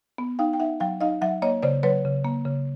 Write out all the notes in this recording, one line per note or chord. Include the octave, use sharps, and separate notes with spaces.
B3
D#4 F5 G5
G5
D#4 E5 F#5
F#3 F5 G5
D#4 D#5 F5
F#3 E5 F#5
A#3 C#5 D#5
C#3 C5 D5
F#3 B4 C#5
C#3
A#3
C#3